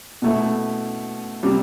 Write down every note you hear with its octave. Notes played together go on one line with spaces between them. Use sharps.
B2 A3 E4
C3 G3 D4